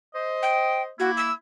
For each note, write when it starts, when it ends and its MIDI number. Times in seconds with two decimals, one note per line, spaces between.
0.15 0.90 72
0.15 0.90 75
0.43 0.82 79
1.00 1.31 58
1.00 1.31 64
1.00 1.11 66
1.17 1.32 88